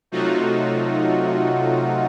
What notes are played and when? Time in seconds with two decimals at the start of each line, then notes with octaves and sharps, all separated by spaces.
0.12 C3 F#3 A3 D#4 F4 F#4